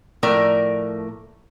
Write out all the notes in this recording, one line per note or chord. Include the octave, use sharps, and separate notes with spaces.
A2 F3 A3 A#4 D5